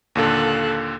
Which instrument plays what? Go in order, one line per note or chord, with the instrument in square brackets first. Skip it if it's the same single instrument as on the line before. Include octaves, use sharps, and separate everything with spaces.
[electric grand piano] D#2 A#2 D3 [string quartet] A4 F5 F#6